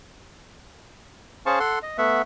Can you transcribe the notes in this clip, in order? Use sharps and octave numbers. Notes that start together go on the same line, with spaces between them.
C#4 G#4 C5 F5 A5 C#6
A4 F#5 C6
D#5
A3 B3 E5 F#5